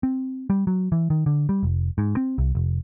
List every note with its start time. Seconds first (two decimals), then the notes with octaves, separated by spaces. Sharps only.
0.03 C4
0.50 G3
0.67 F#3
0.92 E3
1.10 D#3
1.26 D3
1.49 G3
1.63 F1
1.98 G#2
2.17 C4
2.38 C2
2.55 F1